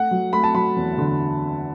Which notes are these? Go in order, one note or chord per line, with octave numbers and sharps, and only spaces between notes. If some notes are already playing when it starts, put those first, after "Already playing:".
Already playing: A3 F#5
F#3
A3 B5
A5
F#3 B5
E2
D3